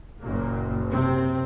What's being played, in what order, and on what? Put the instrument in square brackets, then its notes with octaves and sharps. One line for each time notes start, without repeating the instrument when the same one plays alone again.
[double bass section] F#1 F#2 A#2 A#3
C3 C4